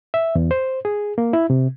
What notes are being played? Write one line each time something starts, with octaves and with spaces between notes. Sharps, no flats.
E5
E2
C5
G#4
A#3
E4
C3